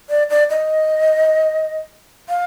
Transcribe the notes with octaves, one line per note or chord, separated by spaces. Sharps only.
D5
D5
D#5
F5